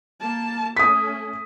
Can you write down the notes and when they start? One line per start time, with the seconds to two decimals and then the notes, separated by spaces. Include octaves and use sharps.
0.20 A#3 A5
0.77 A3 C#4 D#6 B6